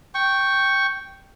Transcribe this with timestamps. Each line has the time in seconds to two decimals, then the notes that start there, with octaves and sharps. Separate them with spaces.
0.14 G5 C#6